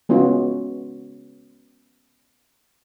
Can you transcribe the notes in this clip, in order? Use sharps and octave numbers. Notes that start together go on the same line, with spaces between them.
G#3 B3 C#4 F4 F#4